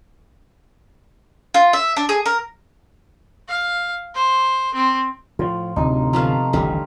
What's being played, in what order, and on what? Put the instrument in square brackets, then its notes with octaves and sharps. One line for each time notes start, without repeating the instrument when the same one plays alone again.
[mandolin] F4
E5
D4
G#4
A#4
[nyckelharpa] F5
C5
C4
[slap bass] A2 F3 [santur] F4
[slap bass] D1 D2 [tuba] C3 [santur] D#4
[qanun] F3 A3 B3 [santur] F5 A#5
[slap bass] D#1 A1 [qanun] D3 G3 A3